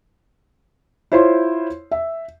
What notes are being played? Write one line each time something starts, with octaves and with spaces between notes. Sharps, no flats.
E4 F4 C5 C#5 C6
E5